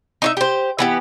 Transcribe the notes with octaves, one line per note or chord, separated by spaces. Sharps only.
D#4 C#5 E5
G4 C5
E3 B3 G4